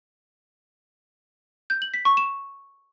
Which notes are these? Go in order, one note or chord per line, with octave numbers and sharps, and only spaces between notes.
G6
F#7
B6
C#6
E7